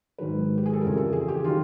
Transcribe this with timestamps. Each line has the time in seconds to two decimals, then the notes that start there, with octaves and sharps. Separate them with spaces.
0.18 G#2 D#3 F#3 B4
0.58 G4
0.66 G#4
0.73 A4
0.81 F2 C#3 E3 G3 A#4
0.97 A4
1.13 G#4
1.28 G4
1.44 D#3 F#3 F4